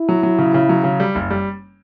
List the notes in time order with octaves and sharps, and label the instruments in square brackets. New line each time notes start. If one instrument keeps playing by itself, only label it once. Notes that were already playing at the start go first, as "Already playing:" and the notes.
Already playing: [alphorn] E4
[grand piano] F#3
F#3
C#3
C#3
F#3
C#3
G3
F#1
G3